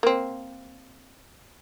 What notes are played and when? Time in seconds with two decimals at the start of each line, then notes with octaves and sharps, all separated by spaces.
0.03 A#3 C4